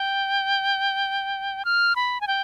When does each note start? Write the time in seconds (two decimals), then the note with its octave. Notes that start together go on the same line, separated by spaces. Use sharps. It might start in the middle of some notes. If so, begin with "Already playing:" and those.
Already playing: G5
1.65 F6
1.96 B5
2.21 G#5
2.28 G5